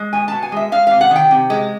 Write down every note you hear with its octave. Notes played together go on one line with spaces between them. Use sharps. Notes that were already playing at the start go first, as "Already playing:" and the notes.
Already playing: G#3
B2 G#5
B2 A5
G#5
G#3 E5
G#3 F5
C3 F5
F#5
D#3 G5
C3
G#3